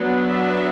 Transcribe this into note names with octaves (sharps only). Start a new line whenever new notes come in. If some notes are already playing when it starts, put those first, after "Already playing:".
Already playing: F#3 B3 D4
E5